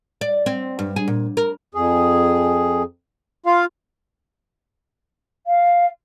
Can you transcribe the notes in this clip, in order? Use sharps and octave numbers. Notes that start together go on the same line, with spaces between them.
D5
C4
G2
G#4
A#2
A#4
F2 G#4
F4 F5
F5